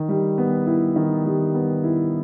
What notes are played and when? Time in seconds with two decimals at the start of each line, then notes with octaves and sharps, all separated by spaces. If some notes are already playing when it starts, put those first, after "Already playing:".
Already playing: D#3
0.09 G3
0.38 B3
0.67 E4
0.96 D#3
1.25 G3
1.55 B3
1.84 E4